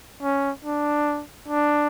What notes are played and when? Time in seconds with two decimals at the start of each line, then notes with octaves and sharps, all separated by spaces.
0.22 C#4
0.64 D4
1.48 D4